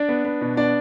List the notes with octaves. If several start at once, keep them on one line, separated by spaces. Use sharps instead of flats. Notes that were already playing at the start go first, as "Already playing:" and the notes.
Already playing: D4 D5
B3
B3
B2
B3 D4 D5